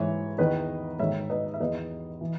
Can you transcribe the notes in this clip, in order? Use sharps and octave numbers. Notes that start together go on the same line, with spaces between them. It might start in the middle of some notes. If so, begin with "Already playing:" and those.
Already playing: G#2 E3 C#5
E2 D#3 B4 D#5
G#2 D#3 C#5 E5
B4 D#5
E5
E2 D#3 B4 D#5
E3